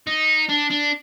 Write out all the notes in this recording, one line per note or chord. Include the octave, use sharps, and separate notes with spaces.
D#4
D4
D4